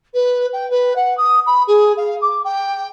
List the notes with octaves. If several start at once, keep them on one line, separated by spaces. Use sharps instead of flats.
B4
G5
B4
F#5
D#6
B5
G#4
F5
D6
G5